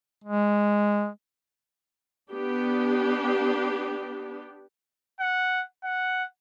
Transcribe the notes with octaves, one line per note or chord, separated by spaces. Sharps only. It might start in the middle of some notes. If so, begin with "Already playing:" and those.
G#3
B3 D4 G4
F#5
F#5